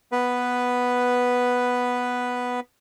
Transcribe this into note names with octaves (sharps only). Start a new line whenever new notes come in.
B3 B4